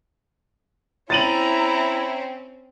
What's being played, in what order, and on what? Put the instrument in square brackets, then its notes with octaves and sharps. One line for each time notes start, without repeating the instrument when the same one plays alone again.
[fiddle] C4 C#4 [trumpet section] E4 [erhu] A#5 [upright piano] A6 D#7 F#7